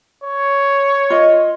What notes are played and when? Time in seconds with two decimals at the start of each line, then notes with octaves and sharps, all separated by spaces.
0.23 C#5
1.10 F4 D#5